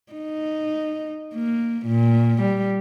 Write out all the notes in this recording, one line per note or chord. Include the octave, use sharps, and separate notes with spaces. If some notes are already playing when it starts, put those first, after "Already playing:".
D#4
A#3
A#2
G3